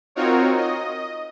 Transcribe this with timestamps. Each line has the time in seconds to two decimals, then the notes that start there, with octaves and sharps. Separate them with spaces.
0.15 C4 D#4 F4 F#4 A#4 C#5
0.57 D#5